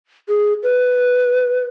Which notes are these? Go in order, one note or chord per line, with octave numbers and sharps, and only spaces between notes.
G#4
B4